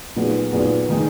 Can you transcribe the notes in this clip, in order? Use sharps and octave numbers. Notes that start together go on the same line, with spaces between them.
A#2 F#3 B3 D#4 G#4
A#2 F#3 B3 D#4 G#4
D#3 G#3 D#4